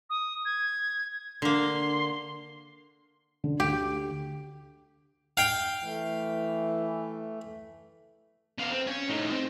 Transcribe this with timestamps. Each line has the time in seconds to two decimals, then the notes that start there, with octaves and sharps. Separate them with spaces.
0.10 D#6
0.45 G#6
1.42 D3 A#3 C6
3.44 D3
3.60 D2 G4
5.37 F5 G5
5.83 E3 A3
8.59 B3 F5
8.70 C4
8.87 C#5 G#5
9.08 A2 D#4
9.32 C4